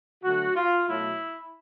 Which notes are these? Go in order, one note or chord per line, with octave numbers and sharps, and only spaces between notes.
D3 F#3 A3 F#4
F4
B2 F#3 A3 E4